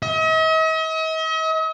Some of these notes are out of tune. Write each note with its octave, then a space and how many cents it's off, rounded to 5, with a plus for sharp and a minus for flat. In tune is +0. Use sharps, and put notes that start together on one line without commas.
D#5 +45